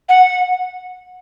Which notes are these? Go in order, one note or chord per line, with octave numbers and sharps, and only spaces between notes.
F#5